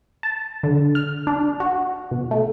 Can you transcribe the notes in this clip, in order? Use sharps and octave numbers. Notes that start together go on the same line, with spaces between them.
A5
D3
F6
D4
F#4
B2
A3